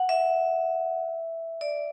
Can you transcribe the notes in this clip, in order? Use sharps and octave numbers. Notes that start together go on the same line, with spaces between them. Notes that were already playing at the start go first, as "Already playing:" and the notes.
Already playing: F#5
E5
D5